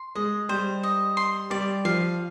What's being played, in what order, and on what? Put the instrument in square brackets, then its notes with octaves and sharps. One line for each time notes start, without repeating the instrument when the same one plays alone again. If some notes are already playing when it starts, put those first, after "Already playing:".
Already playing: [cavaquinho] C6
[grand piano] G#3 [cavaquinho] D#5
[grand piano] G3 [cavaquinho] C5
[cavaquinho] D#5
C6
[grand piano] G3 [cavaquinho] D5
[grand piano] F3 [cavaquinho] F5